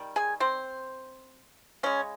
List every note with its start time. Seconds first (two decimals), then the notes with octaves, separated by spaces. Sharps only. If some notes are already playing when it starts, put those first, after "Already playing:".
Already playing: D#3 G3
0.16 G#4 G#5
0.40 C4 C5
1.83 C#3 G#3 C#4